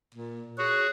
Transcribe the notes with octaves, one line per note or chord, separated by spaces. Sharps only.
A#2
F#4 G#4 C#5 F#6